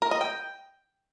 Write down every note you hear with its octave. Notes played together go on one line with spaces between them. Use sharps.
A#4
D#5
G5